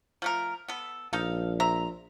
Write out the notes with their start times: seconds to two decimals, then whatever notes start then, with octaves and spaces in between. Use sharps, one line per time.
0.22 F3 A3 A#4
0.68 B3 A4
1.13 A#1 D#4 A4 F5
1.60 C5 E5 A#5